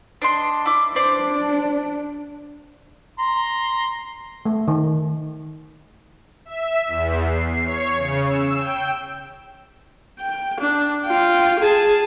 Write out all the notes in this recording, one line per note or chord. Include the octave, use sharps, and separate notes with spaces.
D4 D#5 C6
E4 D6
D4 C5 D5
A#5 C6
A3
D#3
E5
E2
C7
C#5
C#3
E6
G5
G5
D4
F4 G5
G#4 A5